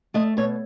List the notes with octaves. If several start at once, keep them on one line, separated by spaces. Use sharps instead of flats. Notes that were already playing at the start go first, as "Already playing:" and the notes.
A3 D#5
B2 C#5